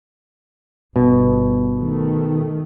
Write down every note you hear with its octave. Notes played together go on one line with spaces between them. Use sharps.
G1 B2
D#3 A3